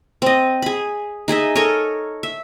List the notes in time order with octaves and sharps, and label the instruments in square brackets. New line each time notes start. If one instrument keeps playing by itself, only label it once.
[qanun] C4 D#5
G#4 B5
D#4 G#4 D#5 E5
A4 A#4 C#5 D#5
E5